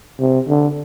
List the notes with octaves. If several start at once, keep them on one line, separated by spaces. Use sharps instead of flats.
C3
D3